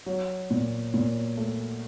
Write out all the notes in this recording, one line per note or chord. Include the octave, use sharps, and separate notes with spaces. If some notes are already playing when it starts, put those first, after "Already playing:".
F#3
A#2
A#2
A3